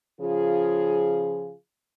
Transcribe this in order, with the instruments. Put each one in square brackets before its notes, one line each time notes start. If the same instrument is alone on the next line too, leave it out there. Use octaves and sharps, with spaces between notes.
[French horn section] C#3 F3 F4 G#4